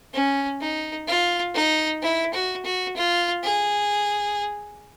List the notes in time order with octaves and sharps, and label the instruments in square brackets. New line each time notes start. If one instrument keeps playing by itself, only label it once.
[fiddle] C#4
D#4
F4
D#4
E4
F#4
F#4
F4
G#4